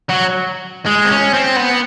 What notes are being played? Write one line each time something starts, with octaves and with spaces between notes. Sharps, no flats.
F#3
G#3
C4
C#4
C4
B3